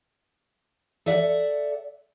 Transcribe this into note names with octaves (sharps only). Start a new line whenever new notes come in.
A4 D5 E5 F#5